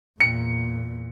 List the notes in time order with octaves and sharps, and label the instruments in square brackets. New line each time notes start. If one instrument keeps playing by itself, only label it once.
[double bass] E2 A#2 [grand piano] C#7